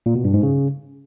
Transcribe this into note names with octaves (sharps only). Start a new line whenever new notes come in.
A#2
B2
G2
G#2
C#3